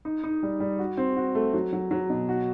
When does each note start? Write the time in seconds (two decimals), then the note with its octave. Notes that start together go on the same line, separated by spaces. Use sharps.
0.05 D#4
0.24 D#4
0.43 G3
0.60 G3
0.79 F#4
0.97 C4
1.17 F#4
1.35 A3
1.54 F#3
1.73 F#3
1.91 F#3
2.10 B2
2.29 F#4